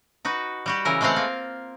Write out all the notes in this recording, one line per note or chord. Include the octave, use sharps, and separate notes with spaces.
D#4 F#4 B4
G3 F#4 G4
C#3 E3 E4 A#4
G#3 A3 C4 B4 F5 F#5
A#3 F4